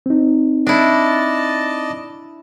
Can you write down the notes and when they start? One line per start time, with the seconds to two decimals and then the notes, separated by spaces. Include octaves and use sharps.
0.06 C4 D#4
0.67 D4 E4 D5 D#5 A5